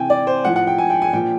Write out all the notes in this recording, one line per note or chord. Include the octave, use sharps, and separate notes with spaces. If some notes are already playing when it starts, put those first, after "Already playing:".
Already playing: C3 E3 G5 G#5
D5
C5
A2 F3 F#5
F#5
G5
G#5
G5
G#5
A#2 F3 G5